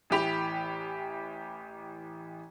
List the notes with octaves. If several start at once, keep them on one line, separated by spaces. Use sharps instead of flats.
A1 E3 G4 B5 F7